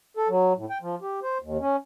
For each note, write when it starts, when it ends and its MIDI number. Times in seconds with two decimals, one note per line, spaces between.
0.17 0.28 69
0.29 0.53 54
0.57 0.65 45
0.70 0.78 79
0.82 0.95 53
1.02 1.20 67
1.23 1.38 72
1.42 1.58 39
1.60 1.76 61